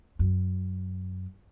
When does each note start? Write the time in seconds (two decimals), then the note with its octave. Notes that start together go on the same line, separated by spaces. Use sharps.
0.19 F#2